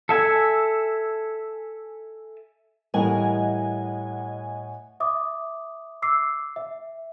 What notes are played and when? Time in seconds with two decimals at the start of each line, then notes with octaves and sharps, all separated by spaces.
0.09 A4 E5 G#5
2.94 A2 E3 G3 A#4 D#5 F#5 G#5
5.00 E5 D6 D#6
6.02 D6 E6 C7
6.56 E5